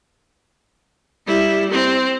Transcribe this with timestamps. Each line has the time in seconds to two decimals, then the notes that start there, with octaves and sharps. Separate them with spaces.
1.27 G3 E4
1.71 C4